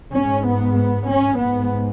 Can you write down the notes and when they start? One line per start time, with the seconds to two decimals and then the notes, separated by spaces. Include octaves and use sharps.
0.15 G#2 C#4
0.47 B3
0.78 B3
1.09 C#4
1.40 G#2 B3